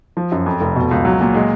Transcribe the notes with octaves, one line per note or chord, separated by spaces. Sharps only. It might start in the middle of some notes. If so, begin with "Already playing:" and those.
F3
F#2
F2
F1
B2
C#2
F#3
A#2
G#3